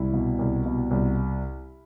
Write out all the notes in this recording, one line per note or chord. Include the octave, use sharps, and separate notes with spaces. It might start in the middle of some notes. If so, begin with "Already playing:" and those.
Already playing: C2 E4
B2
C2
B2
C2